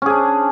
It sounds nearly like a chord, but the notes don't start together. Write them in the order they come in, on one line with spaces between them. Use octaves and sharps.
C#4 G#4 D4